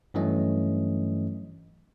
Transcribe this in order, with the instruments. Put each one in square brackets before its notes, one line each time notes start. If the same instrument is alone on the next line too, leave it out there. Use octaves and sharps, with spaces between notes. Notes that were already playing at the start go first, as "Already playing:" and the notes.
[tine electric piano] G2 E3 F#3 A3 C#4 D#5